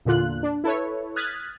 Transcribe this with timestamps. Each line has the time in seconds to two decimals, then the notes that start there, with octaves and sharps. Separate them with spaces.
0.05 E2 A#2 D3 F4 F#6
0.43 D4
0.64 E4 A4 B4 C#5
1.16 D#6 F6 F#6 G#6 A6 B6